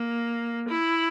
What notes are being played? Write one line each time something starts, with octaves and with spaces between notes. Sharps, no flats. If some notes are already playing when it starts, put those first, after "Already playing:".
Already playing: A#3
E4